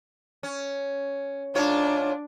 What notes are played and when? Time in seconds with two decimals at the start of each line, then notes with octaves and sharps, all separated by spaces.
0.43 C#4
1.55 G#2 D4 F4 C#5